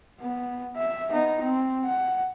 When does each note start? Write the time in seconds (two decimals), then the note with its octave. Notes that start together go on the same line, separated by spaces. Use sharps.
0.21 B3
0.76 E5
1.12 B3 D#4
1.41 C4
1.85 F#5